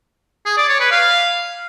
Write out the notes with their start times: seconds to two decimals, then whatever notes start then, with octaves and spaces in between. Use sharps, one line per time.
0.46 G#4
0.57 D5
0.68 C#5
0.80 B4
0.91 F5